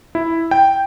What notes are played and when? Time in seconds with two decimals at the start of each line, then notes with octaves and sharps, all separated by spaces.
0.15 E4
0.51 G5